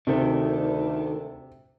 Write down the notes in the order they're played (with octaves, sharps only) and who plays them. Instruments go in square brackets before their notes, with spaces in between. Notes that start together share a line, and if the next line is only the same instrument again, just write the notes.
[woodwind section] D2 [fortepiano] C3 [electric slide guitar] D#3 A3